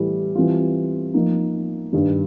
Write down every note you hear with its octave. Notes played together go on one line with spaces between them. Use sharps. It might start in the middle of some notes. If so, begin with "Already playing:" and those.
Already playing: A2 E3 G3
E3 G3 C4 F4
F3 A#3 D#4
G2 D#3 G3